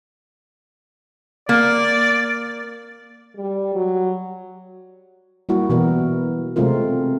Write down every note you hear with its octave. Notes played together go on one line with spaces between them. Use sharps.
A#3 D5
G3
F#3
G3 A#3 E4 F#4
B2 E3 B3 A#4
C3 G#3 A3 C4 F4 A#4